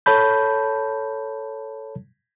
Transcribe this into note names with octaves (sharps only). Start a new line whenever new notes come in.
A4 C#5 A5 B5 G6